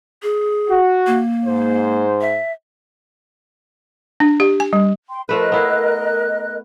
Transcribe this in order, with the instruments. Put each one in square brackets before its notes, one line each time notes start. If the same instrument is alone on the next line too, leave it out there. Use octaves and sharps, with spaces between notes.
[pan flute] G#4
[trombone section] F#4
[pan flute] A#3
[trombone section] G#2 C5
[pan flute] E5
[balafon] D4
G4
G#5
G3
[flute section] G5 C6
[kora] F3 A3 B4 [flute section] A#4 D#5 F#6
[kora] B3 E4 F5